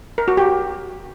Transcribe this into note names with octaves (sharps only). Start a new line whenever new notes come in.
A#4
F#4
G4